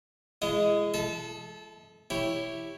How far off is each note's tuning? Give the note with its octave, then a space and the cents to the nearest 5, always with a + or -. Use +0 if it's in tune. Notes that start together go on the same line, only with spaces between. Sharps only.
G#3 +0 E4 +45 D#5 +0
A4 -30 E5 -25 A5 +15
E4 +0 G4 +5 C#5 +0